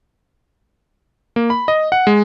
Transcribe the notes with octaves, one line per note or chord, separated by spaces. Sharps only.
A#3
B5
D#5
F#5
G#3